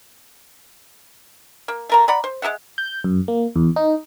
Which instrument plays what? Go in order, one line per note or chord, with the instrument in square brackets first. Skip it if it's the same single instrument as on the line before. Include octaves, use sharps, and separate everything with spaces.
[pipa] A#3
A3 A#4 A#5
D5 F#5 A#5 B5
C5
G#3 G#4 E5 F#5
[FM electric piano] G6
F#2
A#3
E2
D#4